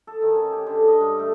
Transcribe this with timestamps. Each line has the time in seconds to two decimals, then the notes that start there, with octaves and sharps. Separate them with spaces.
0.07 A4
0.22 D#3
0.34 C#4
0.52 G4
0.66 D3
0.88 D#5
1.01 G2
1.19 A3